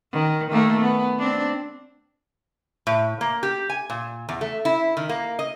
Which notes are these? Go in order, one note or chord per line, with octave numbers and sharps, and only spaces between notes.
D#3
D#3 A3 A#3
B3
C4 D4
A2
A#3
G4
G#5
A#2
E2
A3
E4
D#3
A#3
D#5